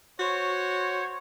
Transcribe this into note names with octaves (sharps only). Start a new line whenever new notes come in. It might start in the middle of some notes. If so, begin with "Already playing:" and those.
F#4 C5 C#5